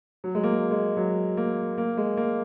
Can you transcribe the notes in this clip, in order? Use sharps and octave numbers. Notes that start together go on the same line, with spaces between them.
F#3
G#3
A#3
G#3
F#3
A#3
A#3
G#3
A#3